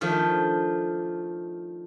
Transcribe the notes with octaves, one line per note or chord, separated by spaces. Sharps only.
D#3 F3 A3 D4